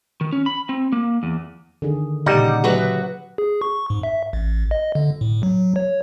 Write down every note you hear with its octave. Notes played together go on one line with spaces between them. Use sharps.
D#3
C#4
B5
C4
A#3
E2
D3 D#3 G#4
A#2 C#3 G3 D#4 G4 F#5
F#3 F#4 G#4 B4 E5
G#4
C#6
G#2
E5
A1
D#5
D3
A2
F#3
C#5